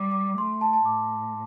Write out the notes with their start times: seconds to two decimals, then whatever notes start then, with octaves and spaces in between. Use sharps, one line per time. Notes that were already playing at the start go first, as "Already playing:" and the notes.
Already playing: G3 D6
0.12 D6
0.38 A3 C6
0.61 A5
0.73 A5
0.85 A2 D6